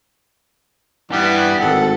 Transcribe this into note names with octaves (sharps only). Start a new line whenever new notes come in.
G2 E3 G3 B3 G4
G#1 A4 F#5